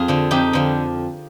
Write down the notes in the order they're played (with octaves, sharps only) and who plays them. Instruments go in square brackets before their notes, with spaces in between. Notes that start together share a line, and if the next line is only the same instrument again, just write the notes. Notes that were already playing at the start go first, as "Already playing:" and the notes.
Already playing: [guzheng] F2 F4 G#4
D3 F3
F2 D#4 G4
D3 F3